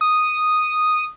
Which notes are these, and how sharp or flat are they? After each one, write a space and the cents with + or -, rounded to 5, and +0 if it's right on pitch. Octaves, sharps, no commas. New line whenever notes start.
D#6 -5